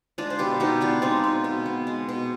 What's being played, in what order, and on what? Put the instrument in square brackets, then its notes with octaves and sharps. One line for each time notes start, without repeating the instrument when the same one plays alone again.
[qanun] G#3 D4 F4
C5
B2 G4 B4
B2 D#4 G4
B3 D4 F4
G#3 C4 D#4
B2
B2
B3
G#3
B2